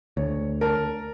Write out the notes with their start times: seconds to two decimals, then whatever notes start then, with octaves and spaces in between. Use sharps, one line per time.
0.17 D2 C#5
0.61 A#4 A5